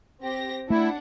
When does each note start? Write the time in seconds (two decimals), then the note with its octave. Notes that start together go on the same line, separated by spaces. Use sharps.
0.22 C4 G4 A#6
0.70 A3 D4 E4 F#5